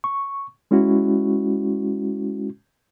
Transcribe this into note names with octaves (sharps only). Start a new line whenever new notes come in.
C#6
G#3 C#4 E4 F#4